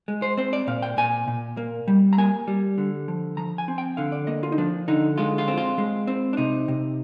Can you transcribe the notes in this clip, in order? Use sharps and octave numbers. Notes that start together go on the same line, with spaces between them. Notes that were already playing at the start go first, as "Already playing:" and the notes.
G#3
C5
C4 C5
D5
A#2 F5
G5
A#2 G#5
A#2
A#3
G3
A#5
A#3 G#5
G3
D3
F3
F3 A#5
G#5
C4
G5
D3 F5
D5
A#3 D#5
F4
D#4
F3 D4
D3 D#4
G#3 F4
F4
C4
F4
G#3
C4
D4
C3 D#4
C3